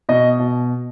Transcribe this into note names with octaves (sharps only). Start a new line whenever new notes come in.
B2 D#5
B2